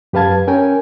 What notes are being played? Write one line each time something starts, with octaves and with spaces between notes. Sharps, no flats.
F#2 G4 B4 F5 A5 G#6
C#4 A#4 G5 G#5